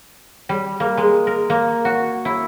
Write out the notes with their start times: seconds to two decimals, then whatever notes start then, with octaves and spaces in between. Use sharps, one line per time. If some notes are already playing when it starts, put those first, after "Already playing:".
0.49 G3
0.80 A#3
0.97 G#3
1.27 A#4
1.50 A#3
1.85 F#4
2.25 E4